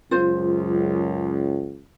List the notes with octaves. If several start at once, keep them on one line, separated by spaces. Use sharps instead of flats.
C#2 F#2 F4 C5